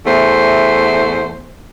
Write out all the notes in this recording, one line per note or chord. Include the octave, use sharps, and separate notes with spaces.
E2 A3 C5